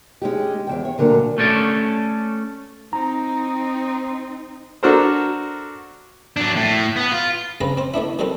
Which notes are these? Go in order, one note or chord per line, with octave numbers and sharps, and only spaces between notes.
G#3 C#4 D#4 G4
E2 F3 G5
C#5
D2 A#2 D3 F#3 A#4
A3 C#4 A4 D5
C4 D#4 A#5
D4 F#4 A4 A#4 C5
F#3 D4
A2
B3
F4
G2 C#3 C4 B4 A#5
C4 C5
A3 B3 D4 E4
D#3 F#3 G3 C4 A4